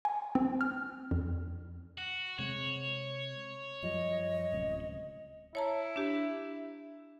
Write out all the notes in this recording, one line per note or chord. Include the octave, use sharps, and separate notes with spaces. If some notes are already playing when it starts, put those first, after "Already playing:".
G#5
C4
F6
F2
F#4
C3 G#3 C4 C#5
F#2 F3 G3 D#5
D1 C#2 C3
E4 C#5 A5 A#5
D4 G4